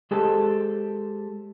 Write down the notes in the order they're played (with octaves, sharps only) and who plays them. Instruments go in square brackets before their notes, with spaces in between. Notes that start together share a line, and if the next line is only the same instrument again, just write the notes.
[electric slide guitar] G#3 G4 A4 C5 A5